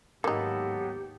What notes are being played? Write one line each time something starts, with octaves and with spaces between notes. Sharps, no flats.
D#2 G#2 F#3 A#3 B3 D#4 G4 A4